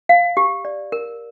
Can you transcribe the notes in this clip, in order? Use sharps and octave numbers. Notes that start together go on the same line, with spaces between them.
F5
G4
D5
A#4